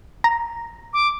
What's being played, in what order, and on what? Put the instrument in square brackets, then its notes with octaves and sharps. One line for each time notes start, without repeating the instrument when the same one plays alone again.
[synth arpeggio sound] A#5
[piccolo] D6